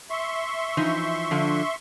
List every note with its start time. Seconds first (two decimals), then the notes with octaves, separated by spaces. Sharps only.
0.10 E5 C6 C#6
0.77 E3 F3 D#4
1.31 D3 F3